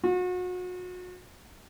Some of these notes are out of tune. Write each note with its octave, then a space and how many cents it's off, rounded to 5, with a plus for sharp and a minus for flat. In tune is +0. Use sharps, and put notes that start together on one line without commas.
F#4 -35